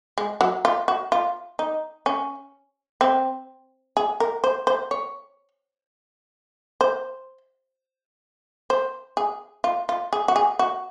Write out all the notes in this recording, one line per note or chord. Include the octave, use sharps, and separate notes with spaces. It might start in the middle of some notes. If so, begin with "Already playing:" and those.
G#3
F#3
F4
F#4
F4
D#4
C#4
C4
G#4
A#4
C5
C5
C#5
C5
C5
G#4
F4
F4
G#4
F#4
G#4
F#4